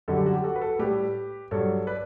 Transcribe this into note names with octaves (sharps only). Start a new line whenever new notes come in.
F#2 D3 G3 F#4 A4
G4
F#4
G4
F#4 A4
B4
F#4 A4
A2 G3 G4 B4
G2 F#3 A4 C#5
B4 D5